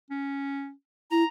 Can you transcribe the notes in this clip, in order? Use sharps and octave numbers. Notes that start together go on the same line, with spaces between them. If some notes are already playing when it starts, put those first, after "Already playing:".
C#4
E4 A#5